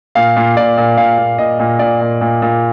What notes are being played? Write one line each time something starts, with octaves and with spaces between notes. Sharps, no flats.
A#2 F5
A#2
A#2 D5
A#2
A#2 F5
A#2
A#2 D#5
A#2
A#2 D5
A#2
A#2
A#2